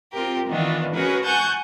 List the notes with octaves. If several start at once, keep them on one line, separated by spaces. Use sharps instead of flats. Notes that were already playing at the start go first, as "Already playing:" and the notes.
C4 F4 G4 A#4
D#3 E3 B3 D4 F4
C#4 F#4 G#4 A#4 B4
F#5 G#5 A5 C#6 G6